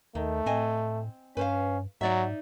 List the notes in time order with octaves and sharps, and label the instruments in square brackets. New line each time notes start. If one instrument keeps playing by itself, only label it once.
[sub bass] D#2 [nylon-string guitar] D#3 [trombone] A3
[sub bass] A2 [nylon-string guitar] C4 D#5 G#5
[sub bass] G2 [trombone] C#4 [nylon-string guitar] B4 C5 F5
[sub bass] G#2 [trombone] F#3 [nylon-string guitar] D#4 D5 E5